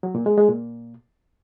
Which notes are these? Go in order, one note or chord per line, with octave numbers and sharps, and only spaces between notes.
F#3
A#2
G#3
G#3
A#2